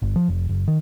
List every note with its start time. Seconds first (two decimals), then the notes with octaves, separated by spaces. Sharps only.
0.02 G1
0.16 F3
0.28 F1
0.49 F#1
0.68 D#3